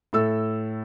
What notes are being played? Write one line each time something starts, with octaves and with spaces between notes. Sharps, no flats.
A2 A4 E6